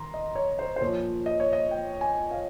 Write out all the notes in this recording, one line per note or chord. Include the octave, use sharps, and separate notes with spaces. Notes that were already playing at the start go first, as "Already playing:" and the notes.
Already playing: D#3 A#5 C6
D#5
C#5
C5
C5
A#2 F3 C#5
D#5
C#5
D#5
G5
G#5
F5